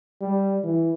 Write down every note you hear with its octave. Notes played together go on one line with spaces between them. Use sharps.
G3
E3